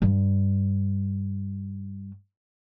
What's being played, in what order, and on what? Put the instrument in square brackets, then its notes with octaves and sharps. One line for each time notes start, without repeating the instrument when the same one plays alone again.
[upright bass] G2 G3